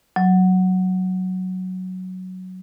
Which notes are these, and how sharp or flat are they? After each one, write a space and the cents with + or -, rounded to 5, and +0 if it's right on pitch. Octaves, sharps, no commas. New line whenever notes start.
F#3 +0